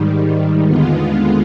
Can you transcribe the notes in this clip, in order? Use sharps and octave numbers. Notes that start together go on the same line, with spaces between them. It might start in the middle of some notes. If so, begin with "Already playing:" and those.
Already playing: G#2 D#3 G3
D#2 D3 G#3 B3 F4